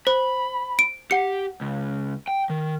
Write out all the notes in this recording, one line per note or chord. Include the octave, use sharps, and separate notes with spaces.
C5 B5
D7
G4 F#5 C#7
C#2
G5
D#3